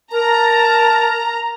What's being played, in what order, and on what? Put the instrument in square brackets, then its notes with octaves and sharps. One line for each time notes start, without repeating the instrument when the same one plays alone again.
[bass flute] A#4 [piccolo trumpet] A5 [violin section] A#5